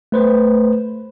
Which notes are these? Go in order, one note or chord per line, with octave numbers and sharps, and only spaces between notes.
A3 B4 C5